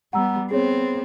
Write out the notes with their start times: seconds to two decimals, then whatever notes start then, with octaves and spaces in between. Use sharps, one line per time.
0.13 G3 B3 F#5 A#5 E6
0.51 B3 C4 G#4 C#5